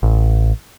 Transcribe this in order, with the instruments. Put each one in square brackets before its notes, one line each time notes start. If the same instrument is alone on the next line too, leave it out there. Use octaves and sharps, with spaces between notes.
[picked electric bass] A1